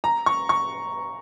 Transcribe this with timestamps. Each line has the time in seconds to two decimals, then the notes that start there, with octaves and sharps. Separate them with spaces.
0.04 A#5
0.26 C#6
0.49 C#6